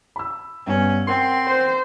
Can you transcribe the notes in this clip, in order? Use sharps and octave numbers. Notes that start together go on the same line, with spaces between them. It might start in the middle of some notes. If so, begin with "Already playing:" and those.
B5 E6
G2 B3 C#4
C4 A#4 F#5 C6
C5